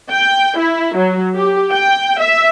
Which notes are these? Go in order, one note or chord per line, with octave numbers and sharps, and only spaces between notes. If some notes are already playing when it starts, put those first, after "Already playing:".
G5
E4
F#3
G4
G5
E5